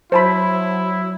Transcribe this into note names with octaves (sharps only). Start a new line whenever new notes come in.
F#3 E4 C5 A5 B5